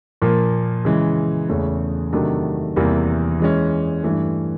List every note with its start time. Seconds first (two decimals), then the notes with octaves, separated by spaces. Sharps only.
0.22 A#2 F3 A#3
0.85 C#3 E3 G#3
1.49 E2 C#3 E3 A3 C#4
2.13 C3 D#3 F#3 A3 D4
2.76 E2 C3 E3 G3 A#3
3.40 E3 G#3 C#4
4.04 G2 E3 A3